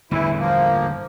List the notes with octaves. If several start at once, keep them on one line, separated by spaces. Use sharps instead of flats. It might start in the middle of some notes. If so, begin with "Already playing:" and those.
G1 E2 A2 E3 E4
F3 A#3